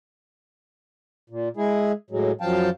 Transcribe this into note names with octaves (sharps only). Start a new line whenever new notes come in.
A#2
G#3 E4 G#4
A2 F#3 G#3
F#2 F3 F#3 F5 G5 A5